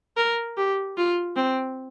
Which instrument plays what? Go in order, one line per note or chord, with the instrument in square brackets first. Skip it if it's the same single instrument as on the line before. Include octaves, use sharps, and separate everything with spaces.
[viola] A#4
G4
F4
C4